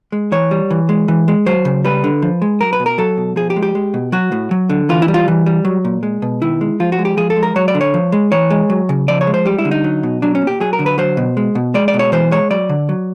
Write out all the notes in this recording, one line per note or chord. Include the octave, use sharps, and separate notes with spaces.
G#3
E3 C#5
G3
E3
G#3
E3
G#3
F#3 C5
C#3
G3 B4
D3
F3
G#3
F#3 A#4
B4
B2
A#4
F#3 A4
B2
F3 G#4
G4
G#3
G4
G#3
B2
F#3 F#4
A2
F#3
D3
E3 F4
E4
G3
F4
E3
G3
F#3
A#2
G#3
B2
D#3 E4
G#3
F3 F4
F#4
G#3
G4
F3 G#4
A4
G#3
A#4
F#3 C#5
D5
D3
C#5
F3
G#3
E3 C#5
G#3
F#3
C#3
F3 D5
C#5
G#3
C5
G3 G4
E4
D3
D#4
F#3
B2
F#3 D4
C#4
A#2
G4
F#3 G#4
A#4
D3
B4
F#3 C5
B2
G#3
B2
G#3 D5
D5
B2
C#5
E3 C5
G#3 C#5
F#3 D5
D3
F#3